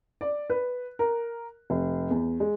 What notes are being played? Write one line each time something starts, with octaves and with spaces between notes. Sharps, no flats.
D5
B4
A#4
F1
E2
G#3